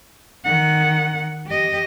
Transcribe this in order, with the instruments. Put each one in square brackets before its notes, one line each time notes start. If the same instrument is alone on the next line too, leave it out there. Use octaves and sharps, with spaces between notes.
[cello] D#3 F#5
G4 D#5